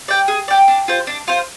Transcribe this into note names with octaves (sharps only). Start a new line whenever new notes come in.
D5 G5
G#4
D5 G5
D4
F4 C5
D4
F4 C5